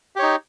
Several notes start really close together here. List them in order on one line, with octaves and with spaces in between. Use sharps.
G4 C#5 D#4